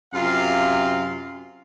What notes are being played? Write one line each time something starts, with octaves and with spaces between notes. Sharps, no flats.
F#2 C3 F4 F5